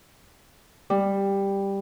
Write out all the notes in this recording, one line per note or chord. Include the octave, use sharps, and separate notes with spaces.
G3